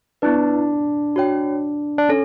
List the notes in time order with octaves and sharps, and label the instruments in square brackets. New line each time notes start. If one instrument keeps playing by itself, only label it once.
[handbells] B3 E4 B4 [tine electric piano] D4
[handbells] F#4 C#5 G5
[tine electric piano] D4
[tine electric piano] C#4 [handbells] A4